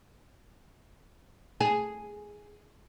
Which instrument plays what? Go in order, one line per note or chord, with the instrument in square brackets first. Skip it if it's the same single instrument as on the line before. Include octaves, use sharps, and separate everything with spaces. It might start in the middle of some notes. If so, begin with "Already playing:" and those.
[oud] G#4